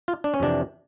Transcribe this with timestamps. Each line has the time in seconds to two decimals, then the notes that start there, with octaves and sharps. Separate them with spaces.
0.08 F4
0.24 D4
0.34 C#4
0.40 F2 C3 E3 D4